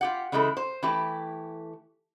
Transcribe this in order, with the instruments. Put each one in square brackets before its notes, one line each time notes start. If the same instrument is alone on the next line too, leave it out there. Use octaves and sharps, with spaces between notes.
[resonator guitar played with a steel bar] F4 G4 F#5
C#3 E3 G#3 E4 G4 A4
C5
E3 A3 E4 G4